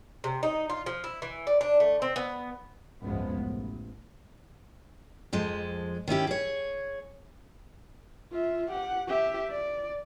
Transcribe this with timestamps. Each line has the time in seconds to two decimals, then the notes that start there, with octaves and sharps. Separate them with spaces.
0.24 C3
0.43 D#4
0.70 F4
0.86 F3
1.04 E4
1.22 E3
1.47 D5
1.61 D4
1.80 A3
2.02 C4
2.16 B3
3.02 G#1 C#2 F#2 F3 G#3 B3
3.35 A1
5.33 F2 F3 G#3
6.08 D#3 C#4 E4 G4
6.27 G#4 C#5
8.32 F4 E5
8.70 G4 F#5
9.07 G4 E5
9.50 D5